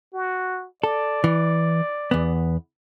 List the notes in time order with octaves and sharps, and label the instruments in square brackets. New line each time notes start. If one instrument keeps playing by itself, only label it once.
[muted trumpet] F#4
[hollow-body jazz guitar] A4 [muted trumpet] D5
[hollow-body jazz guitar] E3
E2 B3